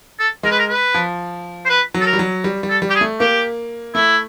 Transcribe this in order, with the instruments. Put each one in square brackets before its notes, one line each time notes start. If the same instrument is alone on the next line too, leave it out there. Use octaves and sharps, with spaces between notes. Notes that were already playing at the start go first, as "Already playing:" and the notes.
[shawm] A4
[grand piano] G#3 [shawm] A#4
[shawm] B4
A#4
B4
[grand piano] F3
[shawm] C5
B4
[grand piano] F#3
[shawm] A4
A#4
[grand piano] G3
F#3
G3
G3
[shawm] A4
[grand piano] G3
[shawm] G4
G#4
[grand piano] A3
[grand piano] A#3 [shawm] G4
[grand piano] A3 [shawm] E4